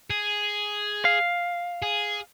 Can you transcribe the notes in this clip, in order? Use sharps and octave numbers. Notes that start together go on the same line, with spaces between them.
G#4
F5
G#4